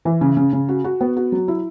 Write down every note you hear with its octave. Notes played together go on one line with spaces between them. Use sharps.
E3
C#3
C#3
C#3
F#4
F#4
B3
F#4
F#3
E4